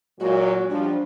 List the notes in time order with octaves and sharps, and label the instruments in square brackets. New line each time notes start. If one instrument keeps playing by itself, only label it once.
[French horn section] A#2 F#3 G#3 [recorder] F#4
[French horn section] F3 G3 [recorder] D4